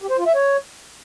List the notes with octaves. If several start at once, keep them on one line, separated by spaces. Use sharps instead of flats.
G4
C5
F4
E5
C#5